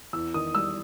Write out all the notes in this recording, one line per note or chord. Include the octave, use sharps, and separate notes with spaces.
E2 E6
D#3 D#6
G3 E6